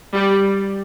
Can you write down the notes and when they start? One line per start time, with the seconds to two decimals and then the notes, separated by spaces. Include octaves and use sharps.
0.14 G3